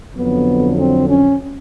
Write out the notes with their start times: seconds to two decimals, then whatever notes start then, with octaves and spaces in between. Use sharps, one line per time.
0.15 F2 D3 F#3 B3
0.78 C4
1.08 C#4